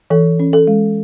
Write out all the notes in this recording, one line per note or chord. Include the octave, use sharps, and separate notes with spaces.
E3 A4
C#4
A4
G#3